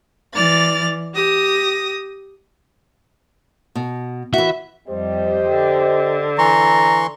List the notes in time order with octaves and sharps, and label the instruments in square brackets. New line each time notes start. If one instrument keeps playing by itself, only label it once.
[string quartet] E3 D5 F6 A6
G4 D#6 A#6
[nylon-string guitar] B2
[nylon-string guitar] E3 F#4 [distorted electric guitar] E5
[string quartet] F2 G3 [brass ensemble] G4 C5 D#5
[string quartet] D3
[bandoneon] E3 C6 C#6 [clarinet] A#5